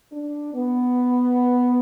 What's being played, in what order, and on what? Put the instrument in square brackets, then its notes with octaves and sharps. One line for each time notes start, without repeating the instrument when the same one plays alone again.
[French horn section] D4
B3